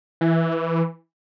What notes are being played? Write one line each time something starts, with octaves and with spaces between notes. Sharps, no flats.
E3